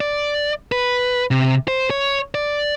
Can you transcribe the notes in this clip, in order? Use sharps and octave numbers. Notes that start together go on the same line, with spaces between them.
D5
B4
C3
C5
C#5
D5